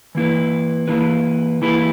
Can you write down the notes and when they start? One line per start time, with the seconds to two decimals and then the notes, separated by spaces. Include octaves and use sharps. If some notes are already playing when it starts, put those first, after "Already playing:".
0.15 E3 A#3 E4 B4
0.88 E3 A#3 E4 B4
1.62 E3 A#3 E4 B4